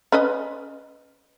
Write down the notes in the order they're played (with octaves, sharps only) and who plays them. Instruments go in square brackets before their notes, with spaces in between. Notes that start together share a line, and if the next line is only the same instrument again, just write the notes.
[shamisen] C#4 B4 D#5